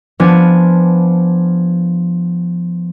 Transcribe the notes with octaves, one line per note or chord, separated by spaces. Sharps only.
F3 B3 D4 G#5